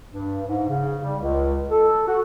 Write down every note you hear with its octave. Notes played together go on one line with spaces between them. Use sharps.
G2
G#2
C#3
G3
C#2
A4
F#4